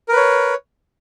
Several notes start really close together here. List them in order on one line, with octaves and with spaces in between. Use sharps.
A#4 B4 C#5